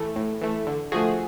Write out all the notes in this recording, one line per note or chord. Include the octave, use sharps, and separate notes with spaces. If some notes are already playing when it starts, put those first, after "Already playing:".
Already playing: A2 E3 A3
A2
E3 A3
D3
F3 A3 F#4 G#4